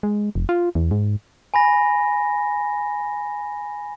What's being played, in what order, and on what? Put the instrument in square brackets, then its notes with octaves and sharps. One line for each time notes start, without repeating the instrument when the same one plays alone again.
[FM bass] G#3
F1
F4
E2
G#2
[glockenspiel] G#5 B5 A#6